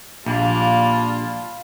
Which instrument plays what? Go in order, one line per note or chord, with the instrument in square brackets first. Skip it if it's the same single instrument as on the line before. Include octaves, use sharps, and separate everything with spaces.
[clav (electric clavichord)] A#1 [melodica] G3 D4 A5 [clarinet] A#3 [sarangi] F4